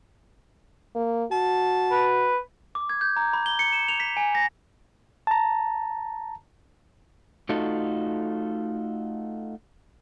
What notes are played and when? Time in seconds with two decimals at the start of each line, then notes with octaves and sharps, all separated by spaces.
0.95 A#3
1.32 F#4 A5
1.91 B4
2.75 D6
2.89 G#6
3.01 G6
3.16 A#5
3.33 B5
3.46 G7
3.59 C#7
3.73 E7
3.88 F7
4.00 B6
4.17 G#5
4.35 A#6
5.27 A5 A#5
7.49 A3 D#4 F4 F#4 A4